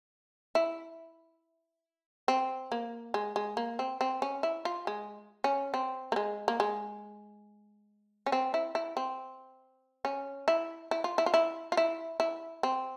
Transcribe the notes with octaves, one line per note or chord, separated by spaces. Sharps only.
E4
C4
A#3
G#3
G#3
A#3
C4
C4
C#4
E4
F4
G#3
C#4
C4
A#3
G#3
A#3
G#3
C#4
C4
E4
E4
C4
C#4
E4
E4
F4
E4
F4
E4
F4
E4
E4
C4